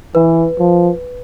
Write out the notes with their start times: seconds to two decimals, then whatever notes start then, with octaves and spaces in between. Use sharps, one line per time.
0.15 E3 B4
0.59 F3